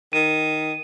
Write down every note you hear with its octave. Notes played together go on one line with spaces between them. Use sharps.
D#3 D#7